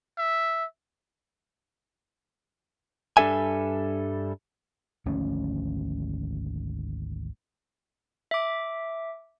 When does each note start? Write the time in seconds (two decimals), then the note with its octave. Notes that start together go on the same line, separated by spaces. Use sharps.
0.18 E5
3.17 G2 G3 D4 A4 E5 G#5
5.05 G#1 D2 F3 C#4
8.31 E5 D6